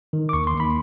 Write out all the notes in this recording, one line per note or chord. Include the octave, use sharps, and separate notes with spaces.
D#3
D6
D#2 C#6
C6
D#2
B5